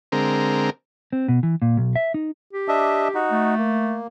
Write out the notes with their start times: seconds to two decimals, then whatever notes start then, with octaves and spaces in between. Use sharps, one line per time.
0.12 D3 G#3 C4 A#4
1.13 C4
1.28 B2
1.43 E3
1.62 A#2
1.77 B1
1.96 E5
2.14 D#4
2.53 G4
2.68 D4 D#5 E5
3.14 D#4 F#4
3.31 A3
3.58 A#3